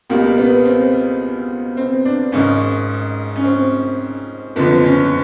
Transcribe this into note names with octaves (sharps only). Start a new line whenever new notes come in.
C#2 B2 G3 A#3
B3
C4
C4
D4
G#1 G#2 D#3 C#4
C#4
C4
F#1 F2 D3 F3 B3
C#4